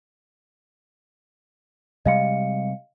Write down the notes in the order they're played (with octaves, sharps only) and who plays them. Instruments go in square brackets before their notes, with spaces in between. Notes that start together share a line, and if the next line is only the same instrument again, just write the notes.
[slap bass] C3 G3 G#3 [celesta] D#5 F5 C#7